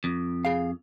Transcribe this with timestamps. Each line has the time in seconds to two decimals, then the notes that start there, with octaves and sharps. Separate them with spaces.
0.04 F2
0.45 G#4 F5